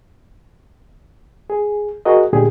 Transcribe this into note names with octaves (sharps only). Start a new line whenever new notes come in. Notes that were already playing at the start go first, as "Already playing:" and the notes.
G#4
F#4 G#4 A#4 D#5
A#2 D3 G#3 G4 G#4